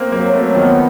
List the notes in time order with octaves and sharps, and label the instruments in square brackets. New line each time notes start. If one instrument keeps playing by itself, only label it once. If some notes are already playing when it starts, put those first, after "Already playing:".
Already playing: [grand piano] A#3 C4
[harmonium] F#3 [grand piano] A#3 C4
[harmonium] F#3 [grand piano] A3 B3
[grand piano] D#3 F3 [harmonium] B3